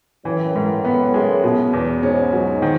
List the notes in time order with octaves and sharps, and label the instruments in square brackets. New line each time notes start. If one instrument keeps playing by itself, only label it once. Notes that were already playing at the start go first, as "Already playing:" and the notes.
[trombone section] F#2 A2 [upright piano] E3
[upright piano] G#2
B3
G#3
B2
E2
[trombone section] G#2 [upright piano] C#4
[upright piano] F#3
D#3